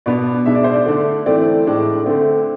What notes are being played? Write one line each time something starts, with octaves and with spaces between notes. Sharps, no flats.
B2 B3 D4 D5
B2 G#3 D4 E5
D5
C5
D5
D3 A3 D4
E3 A3 C4 D5
A2 G#3 D4
D3 A3 C4